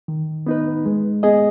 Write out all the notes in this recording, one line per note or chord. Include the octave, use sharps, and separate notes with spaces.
D#3
B3 D#4 B4
G#3
B3 G#4 D#5